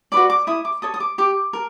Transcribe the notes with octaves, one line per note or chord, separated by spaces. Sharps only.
F#4 B4 D5 D6
D6
E4 D#6
D6
A4 C#5 D#6
D#6
D6
G4 D6
A#4